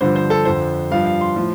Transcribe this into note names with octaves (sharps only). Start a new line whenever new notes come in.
G2 D3 F3 C5
C5
A4
F2 D3 F3 C5
G2 F3 F5
F5
C6
A2 F3